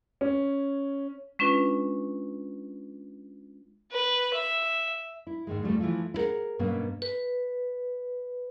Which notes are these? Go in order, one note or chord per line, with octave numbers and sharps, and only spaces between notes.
C#4
G#3 C#4 D4 F4 B4
B4
E5
E4
G#2 D#3 G#3
E2 E3 F3 G3 A3 C4
E3 F3 A3 F4
E4 G#4 A#4 F#5
G2 B2 F#3 A#3 B3 C#4
B4